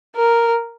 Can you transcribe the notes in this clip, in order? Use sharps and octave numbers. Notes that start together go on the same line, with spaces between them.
A#4